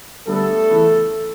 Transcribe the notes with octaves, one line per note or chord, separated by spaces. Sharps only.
D3 G3 A3 B3 A4
C#3 E3 B3